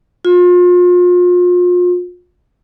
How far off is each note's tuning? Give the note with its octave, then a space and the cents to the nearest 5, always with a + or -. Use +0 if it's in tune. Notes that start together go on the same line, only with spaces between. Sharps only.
F4 +35